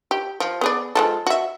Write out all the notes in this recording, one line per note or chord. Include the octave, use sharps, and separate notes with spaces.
G4
F3
B3 G#4 D5
F3 G#3 A4
F#4 E5